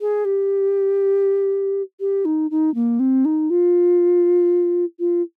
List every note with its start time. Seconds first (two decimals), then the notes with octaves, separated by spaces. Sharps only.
0.01 G#4
0.25 G4
2.00 G4
2.25 D#4
2.51 D#4
2.75 A#3
2.99 C4
3.25 D#4
3.50 F4
4.99 F4